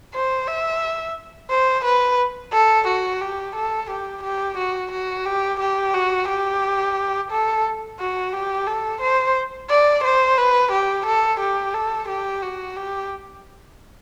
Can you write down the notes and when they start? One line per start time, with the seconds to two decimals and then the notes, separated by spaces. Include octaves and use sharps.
0.14 C5
0.48 E5
1.50 C5
1.85 B4
2.52 A4
2.87 F#4
3.21 G4
3.56 A4
3.90 G4
4.23 G4
4.58 F#4
4.92 F#4
5.26 G4
5.60 G4
5.94 F#4
6.28 G4
7.31 A4
7.99 F#4
8.33 G4
8.67 A4
9.01 C5
9.70 D5
10.04 C5
10.38 B4
10.72 G4
11.06 A4
11.40 G4
11.74 A4
12.09 G4
12.42 F#4
12.76 G4